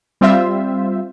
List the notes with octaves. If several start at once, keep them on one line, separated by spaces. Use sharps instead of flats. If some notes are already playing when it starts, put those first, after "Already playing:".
G3 C4 F4 C5 E5